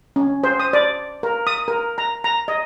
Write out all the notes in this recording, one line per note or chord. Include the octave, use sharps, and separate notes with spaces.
C#4
C5
D#6
D5
A#4
D#6
A#4
A#5
A#5
D#5